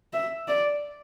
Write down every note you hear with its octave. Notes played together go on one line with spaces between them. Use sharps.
E5
D5